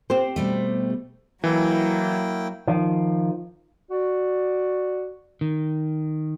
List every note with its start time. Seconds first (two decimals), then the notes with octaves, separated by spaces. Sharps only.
0.10 C4 G4 C5
0.36 B2 G3 A3
1.44 E3 F#3 A#3 E4 G5
2.68 D#3 F3
3.91 F#4 D5
5.41 D#3